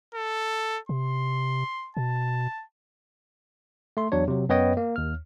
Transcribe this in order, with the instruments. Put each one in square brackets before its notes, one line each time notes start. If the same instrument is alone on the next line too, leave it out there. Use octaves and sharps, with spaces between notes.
[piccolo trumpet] A4
[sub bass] C3 [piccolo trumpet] C6
[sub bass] B2 [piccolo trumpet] A5
[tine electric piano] A3 C6
E2 F#3 D4 C#5
C3 F#3
F#2 B3 B4 C#5 D#5 G5
A#3
D#2 F6